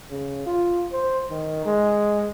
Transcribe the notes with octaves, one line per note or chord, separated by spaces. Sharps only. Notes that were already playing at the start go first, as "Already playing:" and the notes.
C#3
F4
C5
D#3
G#3